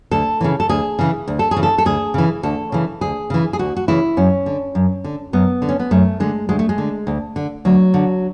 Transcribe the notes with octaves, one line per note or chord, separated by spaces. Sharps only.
D2 A4
C#3 E3
A4
D2 G#4
C#3 E3
D2
A4
G#4
C#3 E3
A4
A4
D2 G#4
C#3 E3
D2 A4
C#3 E3
D2 G#4
C#3 E3
G#4
D2 F#4
F#4
C#3 E3 E4
F#2 C#4
D3
F#2
D3
F#2 B3
D3
C#4
B3
F#2 A3
D3 G#3
D2 G#3
A3
G#3
D3
D2
D3
D2 F#3
D3